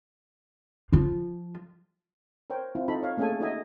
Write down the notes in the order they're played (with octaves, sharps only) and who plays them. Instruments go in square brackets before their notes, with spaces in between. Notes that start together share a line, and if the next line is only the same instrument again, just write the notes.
[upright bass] F3 F4
[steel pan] A#4 C5 C#5 G5
C4 E4 F4
D#4 F4 A4 B5
C#5 F5
A3 A#3 C#4 G#4 A4 G#5
D#4 F#4 A4 D#5 E5 G#5